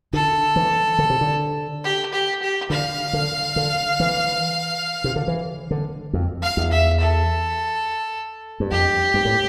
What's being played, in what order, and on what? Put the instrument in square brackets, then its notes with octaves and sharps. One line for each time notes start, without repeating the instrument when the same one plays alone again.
[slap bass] D3 [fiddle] A4
[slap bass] E3
D3
C3
D3
[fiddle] G4
G4
G4
[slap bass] D3 [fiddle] F5
[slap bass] D3
D3
E3
C3
D3
E3
D3
F2
[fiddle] F5
[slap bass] E2
[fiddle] E5
A4
[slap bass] G2
[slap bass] F2 [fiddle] G4
[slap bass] G2
A2